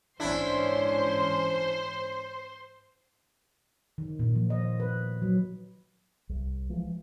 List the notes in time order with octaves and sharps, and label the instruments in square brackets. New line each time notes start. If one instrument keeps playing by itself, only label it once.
[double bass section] G#2 E3 C#4 [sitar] D4 E4 [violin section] C5 C6
[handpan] D#3
A#2
F3
D#5
B4
F#3
[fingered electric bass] C2
E3 F3 G#3